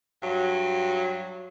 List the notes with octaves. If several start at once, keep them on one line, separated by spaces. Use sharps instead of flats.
G2 F#3